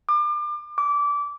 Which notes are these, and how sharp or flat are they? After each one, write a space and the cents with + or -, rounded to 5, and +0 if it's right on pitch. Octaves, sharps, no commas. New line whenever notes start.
D6 +35
D6 -20